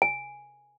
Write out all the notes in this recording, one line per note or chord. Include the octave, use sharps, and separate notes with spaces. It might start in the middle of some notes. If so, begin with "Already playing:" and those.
G#5